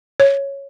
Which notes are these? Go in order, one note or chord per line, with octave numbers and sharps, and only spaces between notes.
C#5